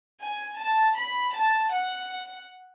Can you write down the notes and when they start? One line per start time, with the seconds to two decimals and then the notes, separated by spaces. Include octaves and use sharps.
0.20 G#5
0.58 A5
0.95 B5
1.34 A5
1.71 F#5